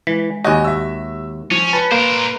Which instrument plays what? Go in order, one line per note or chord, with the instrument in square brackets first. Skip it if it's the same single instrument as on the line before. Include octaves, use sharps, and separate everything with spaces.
[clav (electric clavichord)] E3 [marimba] G#3
[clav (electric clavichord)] D#2 F#4 [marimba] G4 [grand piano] D#5 G#5
[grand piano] E5 E6
[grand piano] F3 [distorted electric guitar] C#4
[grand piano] B4 [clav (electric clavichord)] A5
[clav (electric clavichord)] A#3 [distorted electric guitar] A#4 C5